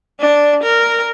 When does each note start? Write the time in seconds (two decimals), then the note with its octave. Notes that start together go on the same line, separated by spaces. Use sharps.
0.20 D4
0.63 A#4